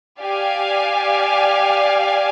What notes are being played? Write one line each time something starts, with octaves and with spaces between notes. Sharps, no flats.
G4 D5 F5 G#5